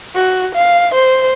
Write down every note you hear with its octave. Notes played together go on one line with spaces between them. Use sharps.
F#4
F5
C5